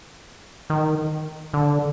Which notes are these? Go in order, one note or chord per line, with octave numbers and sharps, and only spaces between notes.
D#3
D3